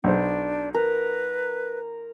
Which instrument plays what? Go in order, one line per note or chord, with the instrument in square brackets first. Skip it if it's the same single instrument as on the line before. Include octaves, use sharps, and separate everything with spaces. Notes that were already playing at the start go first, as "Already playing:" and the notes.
[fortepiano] B1 C5 [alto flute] D4
[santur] A#4 [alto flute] B4